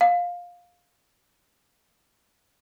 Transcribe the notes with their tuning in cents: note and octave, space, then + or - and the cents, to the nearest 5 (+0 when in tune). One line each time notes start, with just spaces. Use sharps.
F5 +15